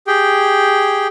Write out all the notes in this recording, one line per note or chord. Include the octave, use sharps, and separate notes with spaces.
G4 G#4 G5